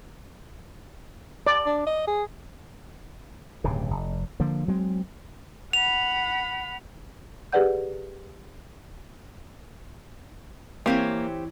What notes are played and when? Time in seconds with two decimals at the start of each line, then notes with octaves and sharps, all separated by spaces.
1.47 D5
1.66 D4
1.87 D#5
2.07 G#4
3.64 D1 G2 C#3
3.91 F1
4.40 D3 F3 A#3
4.68 F#3 G#3 C4
5.73 F#5 B5 F7
7.53 G4 G#4 B4 D5 F#5 G6
10.86 E3 A#3 C4 G4 C#5 E5